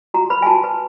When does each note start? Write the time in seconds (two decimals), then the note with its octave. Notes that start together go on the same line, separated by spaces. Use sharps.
0.14 F#4 A#5
0.30 B4 B5
0.42 G#5
0.46 F#4 A5
0.64 B4